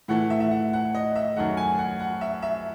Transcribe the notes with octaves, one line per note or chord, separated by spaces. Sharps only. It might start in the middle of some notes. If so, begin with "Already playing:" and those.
A2 E3 A3 F#5
E5
E5
F#5
F#5
D#5
E5
F#2 D#3 A3 F#5
G#5
F#5
F#5
E5
E5